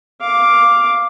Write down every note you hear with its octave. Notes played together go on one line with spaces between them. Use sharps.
F5 D6